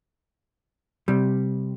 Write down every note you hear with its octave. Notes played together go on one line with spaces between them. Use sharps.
C3 G3